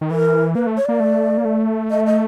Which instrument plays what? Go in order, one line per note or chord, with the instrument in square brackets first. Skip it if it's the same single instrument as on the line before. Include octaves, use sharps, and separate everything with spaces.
[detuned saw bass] D#3
[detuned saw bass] E3 [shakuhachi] A#4
[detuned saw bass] A#3 [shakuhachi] B4
[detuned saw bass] A3
[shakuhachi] C#5
[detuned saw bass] A#3 [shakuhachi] D5
[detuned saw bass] A3
A#3
A3
[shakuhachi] D#5
E5
D#5